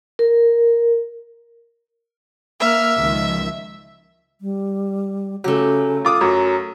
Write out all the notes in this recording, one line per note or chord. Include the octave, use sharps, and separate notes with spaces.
A#4
A#3 E5 F6
C#2 D#3 F3
G3
C#3 F#3 A3 G4
F4 D6 D#6
F#2 F#3 F#4